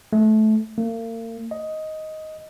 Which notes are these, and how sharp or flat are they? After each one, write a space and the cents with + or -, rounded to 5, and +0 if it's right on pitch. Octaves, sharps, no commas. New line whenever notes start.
A3 -20
A#3 -40
D#5 +5